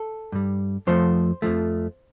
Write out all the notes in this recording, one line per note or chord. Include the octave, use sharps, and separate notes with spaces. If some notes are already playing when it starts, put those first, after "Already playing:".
Already playing: A4
G2 G3
F2 F3 A3 C5
F2 F3 A3